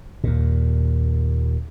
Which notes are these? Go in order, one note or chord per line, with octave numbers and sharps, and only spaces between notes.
D#2 A#2